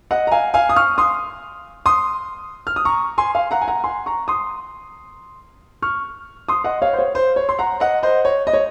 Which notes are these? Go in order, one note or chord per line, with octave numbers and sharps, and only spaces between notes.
D#5 F#5
A#5
F5 G#5
F5 G#5
D#6
C#6 F6
C6 D#6
C6 D#6
F6
D#6
A#5 C#6
G#5 C6
F5 G#5
F#5 A#5
G#5
F#5 A#5
G#5 C6
A#5 C#6
C6 D#6
C#6 F6
C6 D#6
D#5 F#5
C#5 F5
C5
C#5
C5
C#5
C6
F#5 A#5
D#5 F#5
C5 D#5
C#5
D#5
C#5